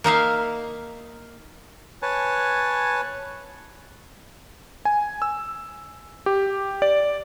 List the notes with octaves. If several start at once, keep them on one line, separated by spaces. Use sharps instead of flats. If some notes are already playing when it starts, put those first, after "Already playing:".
A#3 D#4 E5 F5
B4 C#5 G#5 A5
G#5
E6
G4
D5